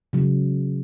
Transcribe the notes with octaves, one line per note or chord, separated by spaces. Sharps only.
C#3 F#3